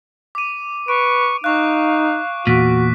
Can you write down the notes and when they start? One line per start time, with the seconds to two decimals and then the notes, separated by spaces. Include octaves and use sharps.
0.35 D6 D#7
0.88 B4 C#6 D7
1.44 D#4 F5 C#6 F#6
2.47 E2 A#2 F#4 B6